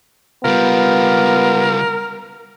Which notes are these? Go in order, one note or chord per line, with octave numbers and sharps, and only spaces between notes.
C#2 G3 B3 F4 A#4